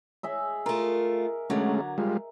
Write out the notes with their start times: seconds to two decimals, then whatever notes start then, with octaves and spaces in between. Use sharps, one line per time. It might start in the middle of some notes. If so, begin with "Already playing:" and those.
0.23 G#4 D#5 E5
0.66 A3 F4 A#4
1.50 D3 F#3 G#3 A3 C#4
1.98 G3 G#3 F4